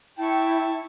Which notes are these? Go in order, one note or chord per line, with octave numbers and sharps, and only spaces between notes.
E4 G5 A5 C#6